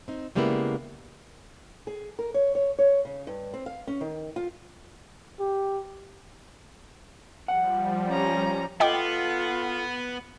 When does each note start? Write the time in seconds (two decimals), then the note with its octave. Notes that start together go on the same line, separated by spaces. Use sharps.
0.08 C4 D#4
0.35 C#3 G3 G#3 A#3 B3 E4
1.87 G#4
2.19 A#4
2.34 C#5
2.55 C#5
2.79 C#5
3.05 C#3
3.27 G2
3.54 C4
3.66 F5
3.87 C#4
4.01 D#3
4.36 F4
5.39 G4
7.48 F3 G3 F#5
8.08 C#4 A#5
8.80 B3 F4 A4 D#5 F#5 G5 D6